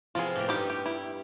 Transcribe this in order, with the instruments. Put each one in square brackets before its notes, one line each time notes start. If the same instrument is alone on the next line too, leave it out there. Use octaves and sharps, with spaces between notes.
[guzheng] C3 F3 B3 [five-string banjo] F4 G#4
[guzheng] A2 A#3 G4
[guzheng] G2 B3 [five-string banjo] D#4 G4
[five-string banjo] G4
[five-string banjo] E4 [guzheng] G4